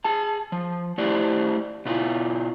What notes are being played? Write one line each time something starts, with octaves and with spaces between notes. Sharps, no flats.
G#4 A5
F3
A3 E4 G4 C5 D5
B2 E4 F4